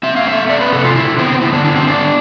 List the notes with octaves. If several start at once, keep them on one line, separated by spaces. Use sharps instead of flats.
C4 E5
F5
A3 E5
C4 D5
B4
C3 A4
F4
D3 E4
B3 C4
D3 E4
D4
B3 D4
C4
D3 D4